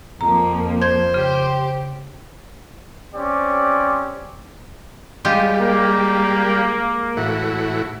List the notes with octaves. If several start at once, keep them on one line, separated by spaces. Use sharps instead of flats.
F2 F3 A#3 A#5
C5 G6 G#6
C#3 G4
C4 C#4 G4 D5
G3 G#3 F4 G4
A#3
A2 E3 F#4